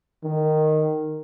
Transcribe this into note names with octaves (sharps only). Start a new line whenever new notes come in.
D#3